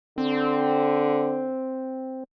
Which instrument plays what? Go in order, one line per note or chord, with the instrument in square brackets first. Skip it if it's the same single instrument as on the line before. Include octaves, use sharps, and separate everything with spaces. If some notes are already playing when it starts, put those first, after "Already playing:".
[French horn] D3 [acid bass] C4